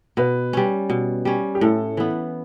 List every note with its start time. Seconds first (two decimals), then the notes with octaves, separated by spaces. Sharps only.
0.17 B2 B4
0.53 G3 C#4
0.90 B2
1.25 G3 C#4
1.55 G4
1.61 A2 A4
1.97 E3 B3